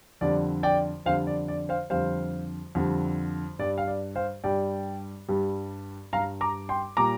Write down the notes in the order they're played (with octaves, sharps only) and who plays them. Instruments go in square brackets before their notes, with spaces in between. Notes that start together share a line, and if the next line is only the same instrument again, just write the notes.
[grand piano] F2 D3 G3 D5
D5 G5
F2 D3 G3 C5 F5
D5
D5
C5 F5
F2 D3 G3 C5 F5
F2 D3 G3
G2 G3 D5
F5
D5
C5 F5
G2 G3 D5 G5
G2 G3
G2 G3 F5 A#5
A#5 D6
G5 C6
A#2 G3 A#5 D6